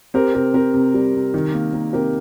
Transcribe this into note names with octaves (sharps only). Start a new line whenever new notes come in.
C4 G4 A#4
C3 G4 A#4
C4 G4 A#4
C3
G3
C3
D#3
A#3
A#3
C3 G4 A#4